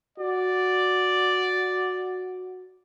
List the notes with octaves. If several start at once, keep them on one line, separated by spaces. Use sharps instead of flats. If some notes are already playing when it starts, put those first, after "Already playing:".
F#4 D5